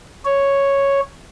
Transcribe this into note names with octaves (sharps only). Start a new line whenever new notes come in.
C#5